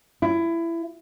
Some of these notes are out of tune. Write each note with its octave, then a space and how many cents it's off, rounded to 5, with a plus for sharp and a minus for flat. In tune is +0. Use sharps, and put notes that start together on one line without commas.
E4 +20